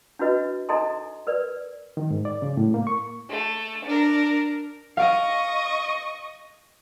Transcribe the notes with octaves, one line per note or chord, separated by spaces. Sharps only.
D4 E4 F#4 B4 D#5
D#4 A4 D#5 G#5 A#5 C6
A#4 B4 D5
D#3
G#2
D5
C#3
A2
A#3
C#6
A3
D4 A#4
D#5 F5 C#6 D7